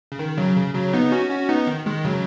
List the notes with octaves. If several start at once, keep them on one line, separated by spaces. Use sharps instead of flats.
C#3
D#3
C#3 F#3
C#3
C#3 F#3
B3 D#4
C#4 F#4
C#4 F#4
B3 D#4
D#3
D#3 G#3
C#3 F#3